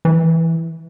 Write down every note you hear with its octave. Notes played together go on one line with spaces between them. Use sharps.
E3